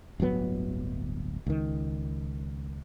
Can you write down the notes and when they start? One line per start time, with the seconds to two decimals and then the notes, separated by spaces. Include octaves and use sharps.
0.20 D1 G1 F#3 B3
1.47 C#2 D#3